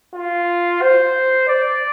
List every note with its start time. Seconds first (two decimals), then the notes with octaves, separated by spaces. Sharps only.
0.14 F4
0.81 C5
1.48 D5